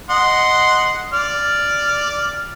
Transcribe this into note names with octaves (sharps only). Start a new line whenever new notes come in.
D#5 F#5 C6
D5 F6